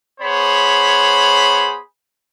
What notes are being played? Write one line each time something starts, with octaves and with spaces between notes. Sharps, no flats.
B3 G#4 C5 C#5 B5